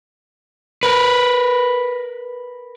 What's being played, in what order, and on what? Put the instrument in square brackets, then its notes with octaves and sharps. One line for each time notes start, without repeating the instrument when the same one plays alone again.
[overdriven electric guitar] A#4 B4